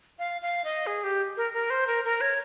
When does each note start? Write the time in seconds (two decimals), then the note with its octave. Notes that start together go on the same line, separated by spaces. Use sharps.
0.19 F5
0.42 F5
0.64 D#5
0.87 G#4
1.04 G4
1.37 A#4
1.54 A#4
1.70 C5
1.87 A#4
2.05 A#4
2.21 C#5